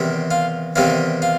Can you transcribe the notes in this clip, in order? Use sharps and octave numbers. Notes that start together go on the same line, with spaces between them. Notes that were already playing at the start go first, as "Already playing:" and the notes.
Already playing: E2 C3 D#3 G3 C4
F4
E2 C3 D#3 G3 C4 F4
F4